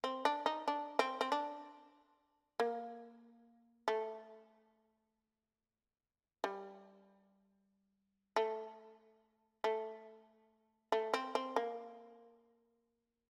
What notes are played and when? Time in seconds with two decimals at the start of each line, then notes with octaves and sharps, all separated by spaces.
0.04 C4
0.25 D4
0.46 D#4
0.68 D4
0.99 C4
1.21 C4
1.32 D4
2.60 A#3
3.88 A3
6.44 G3
8.36 A3
9.64 A3
10.92 A3
11.14 C4
11.35 C4
11.56 A#3